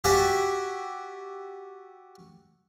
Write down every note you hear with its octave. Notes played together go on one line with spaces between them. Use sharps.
F#4 G4 D5 E5 G#5